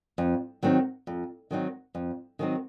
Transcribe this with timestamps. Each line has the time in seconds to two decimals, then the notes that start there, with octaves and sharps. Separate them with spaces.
0.18 F2
0.63 D#3 F#3 C4 D#4
1.07 F2
1.51 D#3 F#3 C4 D#4
1.95 F2
2.39 D#3 F#3 C4 D#4